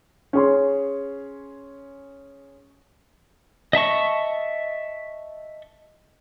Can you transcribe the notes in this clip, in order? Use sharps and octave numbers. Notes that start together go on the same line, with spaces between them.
C#4 G#4 C6
D#5 E5 A5 C#6